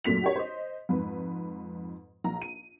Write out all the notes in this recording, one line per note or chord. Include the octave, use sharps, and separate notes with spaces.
F#2 A#2 A3 B6 F7
F#4 G4 C#5
C5 D#5
F2 G#2 B4
A#1 A#5
D#7